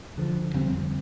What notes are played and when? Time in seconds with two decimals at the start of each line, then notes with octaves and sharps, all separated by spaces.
0.16 D2 D3 F3
0.54 F2 D3 G3 C4